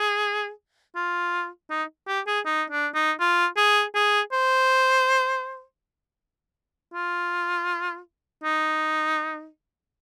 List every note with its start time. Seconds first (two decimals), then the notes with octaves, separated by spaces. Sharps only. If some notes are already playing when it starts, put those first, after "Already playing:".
Already playing: G#4
0.95 F4
1.70 D#4
2.07 G4
2.27 G#4
2.45 D#4
2.70 D4
2.94 D#4
3.20 F4
3.57 G#4
3.95 G#4
4.32 C5
6.94 F4
8.44 D#4